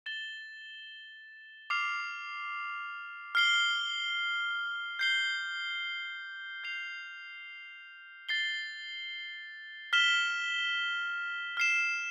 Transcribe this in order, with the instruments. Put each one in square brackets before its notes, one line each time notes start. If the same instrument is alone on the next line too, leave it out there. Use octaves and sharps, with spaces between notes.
[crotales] A6 E7 G7
D6 F6 C7 F7
F6 C7 G7
G6 C7 G7
G6 C7 F7
A6 C7 G7
F6 B6 E7 G7
F6 C7 E7